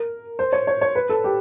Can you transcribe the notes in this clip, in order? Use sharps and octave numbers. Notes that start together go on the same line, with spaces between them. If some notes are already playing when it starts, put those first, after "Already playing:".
Already playing: A#4
C5
C#5
C#5
C#5
B4
A4
G4